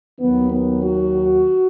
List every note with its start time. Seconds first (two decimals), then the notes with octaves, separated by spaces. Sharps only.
0.20 D#2 D#3 F#3 B3
0.52 B3
0.83 F#4